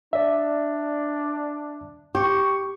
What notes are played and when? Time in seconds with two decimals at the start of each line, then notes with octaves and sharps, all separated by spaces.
0.13 D4 D5 E5
2.15 G4 C#6